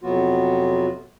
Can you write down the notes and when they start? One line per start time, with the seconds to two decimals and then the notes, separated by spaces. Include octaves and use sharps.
0.03 F2 C3 F#3 B3 F4 F#4